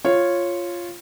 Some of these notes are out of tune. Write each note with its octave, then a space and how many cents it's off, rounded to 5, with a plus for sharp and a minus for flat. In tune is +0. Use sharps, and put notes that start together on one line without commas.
F4 -5 C#5 -10